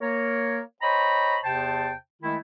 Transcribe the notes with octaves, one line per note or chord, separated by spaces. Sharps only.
A#3 A#4 C#5
C5 C#5 D#5 G5 A#5 B5
E2 C3 C5 G5 A5
D#3 G#3 A3 E4